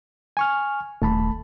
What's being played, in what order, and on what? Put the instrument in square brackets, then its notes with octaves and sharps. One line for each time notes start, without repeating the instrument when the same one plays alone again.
[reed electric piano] G#5 C#6 F6
[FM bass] D#1 [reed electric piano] A3 A5 B5